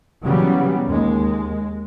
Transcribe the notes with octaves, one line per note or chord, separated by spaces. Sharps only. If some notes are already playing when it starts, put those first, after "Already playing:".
C#3 E3 F#3 G3 B3
D#2 G#3